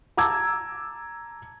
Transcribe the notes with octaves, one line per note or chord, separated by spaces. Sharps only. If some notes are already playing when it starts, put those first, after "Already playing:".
A5 A#5 D6 E6 G#6